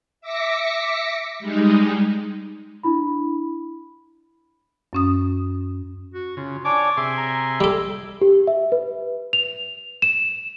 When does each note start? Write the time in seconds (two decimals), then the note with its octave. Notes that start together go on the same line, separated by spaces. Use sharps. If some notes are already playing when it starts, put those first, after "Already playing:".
0.21 E5 D6 A#6 B6 C#7
1.40 G3 G#3 D#4
2.83 D4 E4 B5
4.93 F#2 C#4 D#6
6.14 F#4
6.37 C#3 F4
6.65 D4 C#5 D5 G#5 D6
6.97 C3 G#4 E5 C6
7.18 A#5
7.61 G3 A4 D6
8.21 G4
8.47 E5
8.72 B4
9.33 F7
10.02 E7